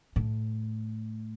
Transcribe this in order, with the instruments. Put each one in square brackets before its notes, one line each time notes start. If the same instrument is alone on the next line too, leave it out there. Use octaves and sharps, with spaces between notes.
[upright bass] A2